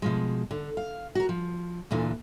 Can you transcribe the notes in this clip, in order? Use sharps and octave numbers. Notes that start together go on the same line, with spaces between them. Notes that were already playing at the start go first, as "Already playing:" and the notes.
B2 F3 G#3
D3
F5
F#4 A#4
F3
D2 A#2 D3 E3